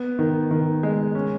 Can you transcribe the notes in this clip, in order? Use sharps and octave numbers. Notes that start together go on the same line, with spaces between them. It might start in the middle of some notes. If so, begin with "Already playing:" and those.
Already playing: B3
D#3
D#3
G#3
C#4